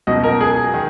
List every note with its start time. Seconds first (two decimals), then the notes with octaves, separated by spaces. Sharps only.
0.07 C#2 B2 F#3 D#5
0.24 A#4
0.41 G#4
0.74 D#3